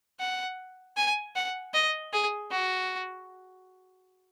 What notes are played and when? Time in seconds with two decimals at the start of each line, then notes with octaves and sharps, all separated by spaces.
0.20 F#5
0.97 G#5
1.36 F#5
1.74 D#5
2.13 G#4
2.51 F#4